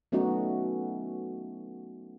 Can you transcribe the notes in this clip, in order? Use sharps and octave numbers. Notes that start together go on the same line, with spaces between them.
F#3 A3 B3 C#4 D#4 F#4